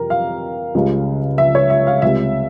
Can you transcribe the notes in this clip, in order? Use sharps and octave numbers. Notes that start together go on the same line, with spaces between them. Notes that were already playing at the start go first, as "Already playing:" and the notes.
Already playing: F2 C3 E3 G3 G4 A#4
F5
C#2 C#3 G3
E5
C#5
E5
F5
C#2 C3 G3 E5